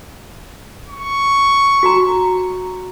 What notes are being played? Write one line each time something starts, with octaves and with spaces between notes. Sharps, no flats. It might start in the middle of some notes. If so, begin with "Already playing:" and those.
C#6
F#4 A#5